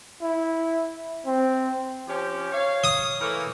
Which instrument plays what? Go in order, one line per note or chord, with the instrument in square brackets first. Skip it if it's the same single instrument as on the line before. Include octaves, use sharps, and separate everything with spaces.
[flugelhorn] E4
C4
[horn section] F3 C#4 G4
C#5 F5
[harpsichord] D#6
[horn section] E3 A3 A#3